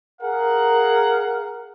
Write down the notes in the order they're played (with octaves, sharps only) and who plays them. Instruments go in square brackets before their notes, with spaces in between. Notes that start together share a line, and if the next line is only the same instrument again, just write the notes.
[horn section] G#4 A#4 F5 F#5